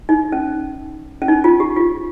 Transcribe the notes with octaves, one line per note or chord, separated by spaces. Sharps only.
D#4
C#4
C#4
D#4
F4
G4
F4